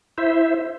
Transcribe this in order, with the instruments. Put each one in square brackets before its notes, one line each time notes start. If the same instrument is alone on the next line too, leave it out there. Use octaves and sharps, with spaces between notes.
[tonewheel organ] E4 C5 E5